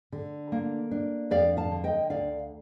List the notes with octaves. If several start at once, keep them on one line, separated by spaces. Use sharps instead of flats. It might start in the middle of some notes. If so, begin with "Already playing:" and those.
D3
A#3
D4
F2 D5 F5
F5 A5
D3
D#5 G5
D2 D5 F5